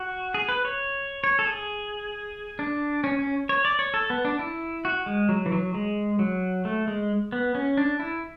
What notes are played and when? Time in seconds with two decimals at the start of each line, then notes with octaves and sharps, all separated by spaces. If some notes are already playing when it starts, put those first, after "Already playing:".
Already playing: F#4
0.34 G#4
0.49 B4
0.65 C#5
1.24 C#5
1.39 A4
1.47 G#4
2.59 D4
3.04 C#4
3.19 C#4
3.49 C#5
3.65 D5
3.79 C#5
3.94 A4
4.10 B3
4.25 D4
4.39 E4
4.85 F#4
5.06 G#3
5.29 F#3
5.46 E3
5.52 F#3
5.74 G#3
6.19 F#3
6.65 A3
6.88 G#3
7.32 B3
7.55 C#4
7.77 D4
7.99 E4